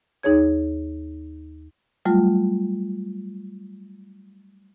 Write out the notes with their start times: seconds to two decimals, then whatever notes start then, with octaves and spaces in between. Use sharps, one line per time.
0.23 D#2 D#4 G#4 C#5 G#6
2.05 F#3 G3 A3 F4